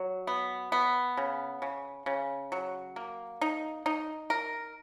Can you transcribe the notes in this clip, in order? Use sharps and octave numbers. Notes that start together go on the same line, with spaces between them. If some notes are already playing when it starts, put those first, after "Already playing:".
Already playing: F#3
B3
B3
C#3
C#3
C#3
F#3
A#3
D#4
D#4
A#4